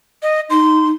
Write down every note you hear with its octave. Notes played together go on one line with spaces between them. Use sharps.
D#5
D#4 C6